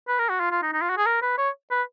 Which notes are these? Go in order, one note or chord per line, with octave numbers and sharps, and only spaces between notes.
B4
A#4
F#4
F4
F4
D#4
D#4
F4
F#4
G#4
A#4
B4
C#5
B4